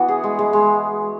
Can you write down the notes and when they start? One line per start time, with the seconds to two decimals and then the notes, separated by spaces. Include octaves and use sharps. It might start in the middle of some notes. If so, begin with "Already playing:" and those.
Already playing: E3 B3 F#4
0.08 G#4
0.24 G#3
0.39 G#3
0.53 G#3